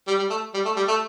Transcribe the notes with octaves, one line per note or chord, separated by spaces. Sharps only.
G3
G3
A3
G3
A3
G3
A3